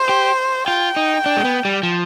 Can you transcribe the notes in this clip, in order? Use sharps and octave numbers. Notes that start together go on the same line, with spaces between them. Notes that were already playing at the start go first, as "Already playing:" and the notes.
Already playing: C5
G4
F4 G5
D#4
D4
G#3
B3
G3
F3